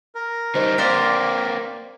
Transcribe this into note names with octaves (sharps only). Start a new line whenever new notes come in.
A#4
G3 D#4 C5
A#3 C4 C5 D5 F5 B6